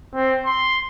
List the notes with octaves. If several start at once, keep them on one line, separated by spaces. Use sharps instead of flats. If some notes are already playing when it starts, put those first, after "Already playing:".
C4
C6